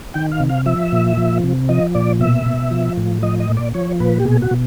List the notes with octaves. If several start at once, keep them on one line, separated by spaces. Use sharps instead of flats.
D#3 G5
F5
C3
F5
F3 E5
A#2
F3
C3
F3 D#5
A#2 D5
B2 E5
B2
F3
A2
F3 D#5
D#5
A#2
D5
F3 C#5
A#2 B4
G4
B2 G#4
F#4
B2